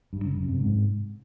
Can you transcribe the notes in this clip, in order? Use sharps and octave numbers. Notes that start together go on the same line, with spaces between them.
G2
C#3
F#2
C3
G#2